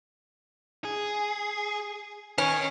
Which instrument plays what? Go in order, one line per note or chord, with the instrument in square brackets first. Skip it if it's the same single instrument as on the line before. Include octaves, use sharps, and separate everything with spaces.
[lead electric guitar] G#4
[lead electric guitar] D#3 [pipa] C#4